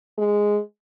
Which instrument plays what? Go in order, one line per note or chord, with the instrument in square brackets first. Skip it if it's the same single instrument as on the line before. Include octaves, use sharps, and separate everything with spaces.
[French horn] G#3